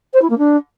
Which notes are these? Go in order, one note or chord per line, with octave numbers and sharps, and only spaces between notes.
C5
E4
A#3
D4